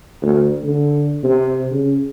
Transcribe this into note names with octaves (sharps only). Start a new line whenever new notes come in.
D2
D3
C3
C#3